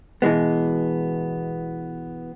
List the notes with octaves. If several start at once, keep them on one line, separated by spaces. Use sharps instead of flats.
B2 E3 G#3 B3